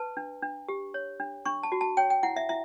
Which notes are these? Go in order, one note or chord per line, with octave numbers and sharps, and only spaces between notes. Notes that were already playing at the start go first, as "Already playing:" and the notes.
Already playing: B4 A5
D4
D4
G4
C#5
D4
D4 C#6
A5
F#4
A5
C#5 G5
G5
E4 F#5
E5
E4 E5